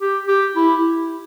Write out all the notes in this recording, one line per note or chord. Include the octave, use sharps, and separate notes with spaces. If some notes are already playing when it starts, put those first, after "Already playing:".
G4
G4
E4